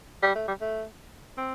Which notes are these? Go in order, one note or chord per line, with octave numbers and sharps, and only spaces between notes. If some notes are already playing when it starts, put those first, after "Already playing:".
G3
A3
G3
A3
C4